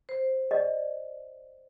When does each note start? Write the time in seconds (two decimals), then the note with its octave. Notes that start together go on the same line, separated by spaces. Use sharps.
0.09 C5
0.51 D5 D#5